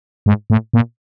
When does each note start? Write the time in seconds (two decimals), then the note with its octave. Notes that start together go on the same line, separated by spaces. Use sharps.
0.26 G#2
0.50 A2
0.73 A#2